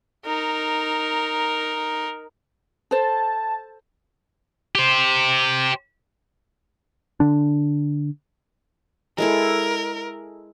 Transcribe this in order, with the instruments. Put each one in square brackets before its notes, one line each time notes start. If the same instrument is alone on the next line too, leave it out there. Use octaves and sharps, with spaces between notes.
[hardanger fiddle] D#4 A#4
[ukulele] A4 C5 [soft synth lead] A5
[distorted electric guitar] G4 C5
[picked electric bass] D3 D4
[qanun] G#3 E4 A4 [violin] A#4